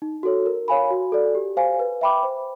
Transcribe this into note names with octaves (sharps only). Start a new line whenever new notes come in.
D#4
F#4 A4 C#5
A#4
C#5 F5 G#5 B5
F#4
A4 D5
G4
C5 F5 G#5
B4
E5 G5 B5 D6
C5